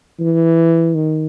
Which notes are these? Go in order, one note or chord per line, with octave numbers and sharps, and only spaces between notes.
E3
D#3